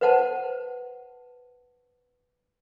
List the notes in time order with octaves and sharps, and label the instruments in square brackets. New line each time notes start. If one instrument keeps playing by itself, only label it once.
[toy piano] B4 C5 F#5 A5